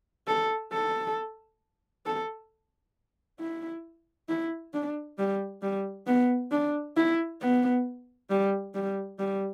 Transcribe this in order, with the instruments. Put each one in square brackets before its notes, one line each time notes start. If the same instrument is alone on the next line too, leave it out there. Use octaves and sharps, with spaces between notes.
[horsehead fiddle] A4
A4
A4
E4
E4
D4
G3
G3
B3
D4
E4
B3
G3
G3
G3